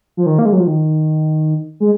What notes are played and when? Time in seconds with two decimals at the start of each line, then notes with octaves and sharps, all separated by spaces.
0.17 F3
0.26 D#3
0.39 A#3
0.46 G#3
0.53 F#3
0.60 F3
0.67 D#3
1.80 G#3